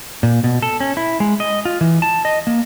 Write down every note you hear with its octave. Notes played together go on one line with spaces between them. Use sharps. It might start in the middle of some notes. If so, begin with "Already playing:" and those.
A#2
B2
A4
C#4
E4
G#3
D#5
F4
E3
A5
D#5
A#3